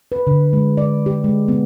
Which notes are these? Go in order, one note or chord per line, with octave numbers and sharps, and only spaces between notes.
B4
D3
G#3
D5
G4
G#3
B3